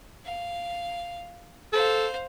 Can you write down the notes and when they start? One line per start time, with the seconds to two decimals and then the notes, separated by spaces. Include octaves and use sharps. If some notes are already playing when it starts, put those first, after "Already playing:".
0.25 F5
1.73 A4 C5 F5